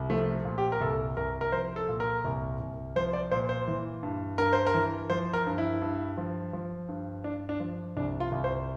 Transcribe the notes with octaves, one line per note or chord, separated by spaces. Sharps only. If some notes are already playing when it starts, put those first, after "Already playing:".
Already playing: C2
F3 A3
A#2
G4
A#4
C2 A4
C2 A#4
A#4
F3 C5
A4
A#2
A#4
C2
C2
F3 C5
D5
A#2 C5
C5
E3
G2
G2 A#4
C5
A#4
E3
F3 C5
A#4
G2
E4
G2
F3
F3
G2
G2 D4
D4
F3
C2 D4
F4
C2
C5